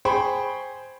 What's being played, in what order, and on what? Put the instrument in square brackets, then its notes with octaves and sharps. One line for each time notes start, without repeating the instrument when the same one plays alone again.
[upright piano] G#4 C5 G5 B5 C#6